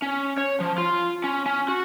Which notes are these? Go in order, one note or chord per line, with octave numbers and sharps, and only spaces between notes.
C#4
C#5
F3
F4
C#4
C#4
F#4